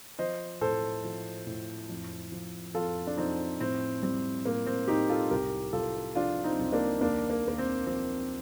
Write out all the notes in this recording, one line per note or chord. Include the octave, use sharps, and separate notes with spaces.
F3 C5 D#5
A2 A4 C5
F3
A2
F2
F3
F2 F4 A4
D4
F2 C4 D#4
A2 C4
G3 C4
A2 A#3
C4
A2 D#4 G4
F4 A4
C2 G4 A#4
C2 F4 A4
F3 D4 F4
C4 D#4
C2
A#3 D4
D#2 A#3 D4
A#3
D#2 A#3
C4
F3 C4